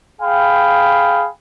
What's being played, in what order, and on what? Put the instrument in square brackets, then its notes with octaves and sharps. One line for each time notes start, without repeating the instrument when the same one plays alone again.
[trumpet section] G#4 F5 G5 B5